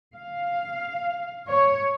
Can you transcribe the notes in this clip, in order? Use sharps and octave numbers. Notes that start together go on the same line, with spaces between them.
F5
C#5